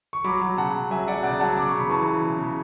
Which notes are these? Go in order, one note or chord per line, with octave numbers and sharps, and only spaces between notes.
C#6
F#3 B5 D6
F#3
C#3 F#5 A5
C#3
F#3 E5 G#5
F#3 D5 F#5
C#3 D5 F#5
F#3 F#5 A5
C#3 D6
C#6
C#3
B5
E3 A5 C#6
E3
C#3
C#3